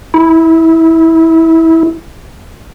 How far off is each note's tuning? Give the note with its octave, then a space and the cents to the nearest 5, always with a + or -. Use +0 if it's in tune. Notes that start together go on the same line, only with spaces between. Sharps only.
E4 -20